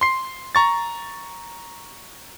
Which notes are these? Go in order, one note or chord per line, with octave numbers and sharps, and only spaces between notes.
C6 C7
A#5 C#6 A6